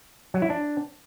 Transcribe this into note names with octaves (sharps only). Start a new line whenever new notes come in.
F#3
E4
D4